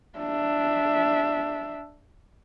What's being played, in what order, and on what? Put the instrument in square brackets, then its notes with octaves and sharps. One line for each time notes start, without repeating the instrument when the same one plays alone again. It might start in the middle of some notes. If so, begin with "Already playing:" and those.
[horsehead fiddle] D4 E5